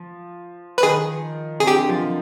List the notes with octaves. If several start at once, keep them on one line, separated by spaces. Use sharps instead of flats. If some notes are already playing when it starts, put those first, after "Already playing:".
Already playing: F3
B4
D#3 G#4
C3 G#4
D3 G4
F3